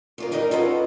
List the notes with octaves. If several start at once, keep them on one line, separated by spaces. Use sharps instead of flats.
F2 F4 A#4
G3 D4 D#4 A#4 C#5 D#5
C#4 F4 F#4 A4 B4 D#5